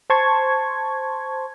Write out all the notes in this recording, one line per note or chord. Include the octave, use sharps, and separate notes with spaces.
C5 A5 C6 C#6 G#6